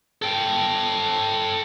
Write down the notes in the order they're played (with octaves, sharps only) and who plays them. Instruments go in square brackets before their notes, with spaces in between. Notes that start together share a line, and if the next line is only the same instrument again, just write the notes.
[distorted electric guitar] A4 G5